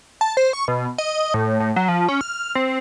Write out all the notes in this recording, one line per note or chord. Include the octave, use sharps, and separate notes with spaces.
A5
C5
C#6
B2
D#5
A2
A2
F#3
F3
C#4
F6
C4